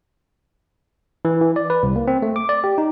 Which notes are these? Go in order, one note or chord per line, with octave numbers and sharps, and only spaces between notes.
E3
E3
D5
B4
C2
A#3
C4
A3
D6
D5
G4
D#4